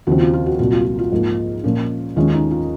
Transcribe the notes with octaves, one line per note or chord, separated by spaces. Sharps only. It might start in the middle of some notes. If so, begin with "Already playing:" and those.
D#2 C#3 F3 C4 F#4
F4
F4
F#4
C2 A#2 F#3 F#4
F4
F4
F4
G#2 F3 A#3
A#2 F3 A#3 C#4
D#2 D#3 G#3 C#4 F4
D#4
F4